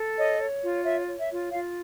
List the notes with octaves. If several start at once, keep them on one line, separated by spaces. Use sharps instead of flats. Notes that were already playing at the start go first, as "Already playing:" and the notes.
Already playing: A4
C#5 D#5
C#5
F4
C#5 E5
C#5
E5
F4
F4 F5